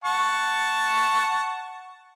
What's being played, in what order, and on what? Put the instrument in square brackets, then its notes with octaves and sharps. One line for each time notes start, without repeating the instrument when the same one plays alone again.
[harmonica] F#5 A5 C#6